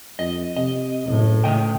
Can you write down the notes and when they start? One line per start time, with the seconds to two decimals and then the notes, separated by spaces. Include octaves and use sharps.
0.19 F2 D#5
0.57 C3 D#5
1.07 F#1 A2
1.44 C#3 A3 D#5 G5